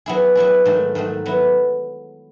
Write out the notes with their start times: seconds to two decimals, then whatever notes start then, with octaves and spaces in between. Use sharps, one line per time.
0.06 F#3 B3 E4 G#4
0.35 F#3 B3 E4 G#4
0.65 G#2 D#3 F#3 A3
0.95 G#2 D#3 F#3 A3
1.26 F#3 B3 E4